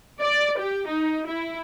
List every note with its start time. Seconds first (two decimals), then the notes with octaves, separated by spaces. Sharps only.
0.21 D5
0.59 G4
0.88 D#4
1.27 E4